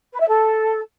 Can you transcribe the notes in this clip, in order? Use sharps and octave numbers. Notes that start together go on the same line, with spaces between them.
B4
E5
A4